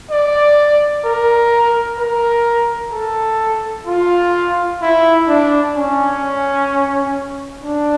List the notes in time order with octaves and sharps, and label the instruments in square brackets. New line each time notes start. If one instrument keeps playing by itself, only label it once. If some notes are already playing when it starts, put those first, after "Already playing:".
[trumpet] D5
A#4
A#4
A4
F4
E4
D4
C#4
D4